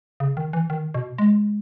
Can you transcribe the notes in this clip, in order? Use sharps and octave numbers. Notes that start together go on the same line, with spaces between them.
C#3
D#3
E3
D#3
B2
G#3